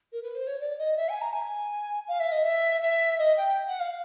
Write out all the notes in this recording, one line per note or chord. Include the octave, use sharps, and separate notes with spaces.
A#4
B4
C5
C#5
D5
D#5
E5
G#5
A#5
G#5
F5
E5
D#5
E5
E5
D#5
G5
F#5
F5